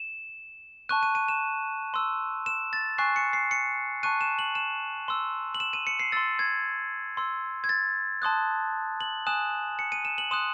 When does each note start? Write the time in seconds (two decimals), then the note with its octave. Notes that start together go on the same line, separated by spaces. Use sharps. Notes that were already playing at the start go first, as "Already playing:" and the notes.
Already playing: E7
0.89 A5 C#6 F#6 D#7
1.03 D#7
1.15 D#7
1.28 E7
1.94 C6 E6
2.46 E7
2.73 A6
2.98 G#5 C#6 F#6 C7
3.16 C#7
3.33 C7
3.51 C#7
4.03 A5 C#6 F#6 D#7
4.21 E7
4.39 F#7
4.55 E7
5.08 C6 E6
5.55 F#7
5.60 E7
5.73 D#7
5.87 C#7
5.99 C7
6.12 C6 E6 A6
6.39 G#6
7.17 C6 E6
7.64 G#6
7.69 A6
8.22 A5 C6 D#6 F#6
9.01 F#7
9.27 G#5 D#6 F#6 E7
9.79 C#7
9.92 D#7
10.05 E7
10.18 F#7
10.31 C6 D#6 F#6 E7